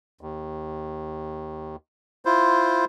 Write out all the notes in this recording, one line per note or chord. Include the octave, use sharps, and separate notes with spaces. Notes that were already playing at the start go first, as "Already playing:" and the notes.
D#2
E4 F4 C5